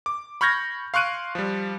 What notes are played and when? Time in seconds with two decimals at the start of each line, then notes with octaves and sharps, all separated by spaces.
0.06 D6
0.41 B5 C#6 F6 G6 G#6 A#6
0.94 F5 C6 C#6 F#6 D7 D#7
1.35 F3 G3